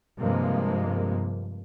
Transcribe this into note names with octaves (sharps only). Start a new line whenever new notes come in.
G2 C3 F3 G#3 A#3